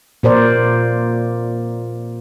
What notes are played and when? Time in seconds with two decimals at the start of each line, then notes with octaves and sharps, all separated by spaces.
0.23 A#2 A#4 C5 D5